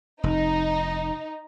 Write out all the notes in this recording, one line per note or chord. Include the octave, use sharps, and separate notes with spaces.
F1 D#4